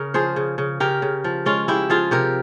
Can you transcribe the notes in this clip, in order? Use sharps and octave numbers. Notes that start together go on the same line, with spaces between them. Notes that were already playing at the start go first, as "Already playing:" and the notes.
Already playing: C#3 A#4
F3 G#4 C5
C#3
C#3
C#3 G4 A#4
C#3
F3
G#3 C#4 F4
G#3 E4 G4
F3 F4 G#4
C3 G4 A#4